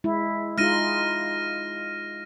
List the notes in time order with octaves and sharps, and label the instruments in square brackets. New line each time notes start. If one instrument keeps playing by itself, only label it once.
[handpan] G#3 E4
[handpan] G#3 D#4 F4 [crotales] F6 A#6 D#7